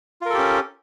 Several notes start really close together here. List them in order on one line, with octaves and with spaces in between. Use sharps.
F4 A#4 A4 G4 C#4